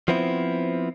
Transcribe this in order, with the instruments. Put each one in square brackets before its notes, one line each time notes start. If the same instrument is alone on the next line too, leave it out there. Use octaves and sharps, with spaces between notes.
[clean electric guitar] F3 B3 C4 E4